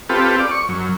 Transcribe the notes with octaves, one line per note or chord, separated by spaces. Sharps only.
C4 F4 G4 A4 B4
D5
C#6
F#2